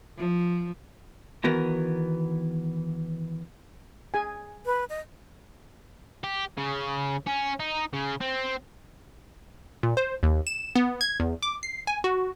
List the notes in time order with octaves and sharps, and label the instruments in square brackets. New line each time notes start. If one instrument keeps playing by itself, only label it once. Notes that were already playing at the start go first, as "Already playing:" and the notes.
[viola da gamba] F3
[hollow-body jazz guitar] D#3 E3 B3 F#4 A#4
[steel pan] G#4 G#5
[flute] B4
D#5
[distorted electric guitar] G4
C#3
C#4
D#4
C#3
C4
[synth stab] A#2
C5
D#2
E7
B3
G#6
E2
D6
C7
G#5
F#4